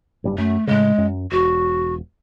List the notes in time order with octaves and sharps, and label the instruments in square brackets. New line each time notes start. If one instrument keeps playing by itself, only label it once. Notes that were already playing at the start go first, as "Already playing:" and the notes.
[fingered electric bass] F#1 G2 G3
[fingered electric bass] F#2 [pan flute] A3
[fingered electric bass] A2 C#3 [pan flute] G#3
[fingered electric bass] F#2
[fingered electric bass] E1 [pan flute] F#4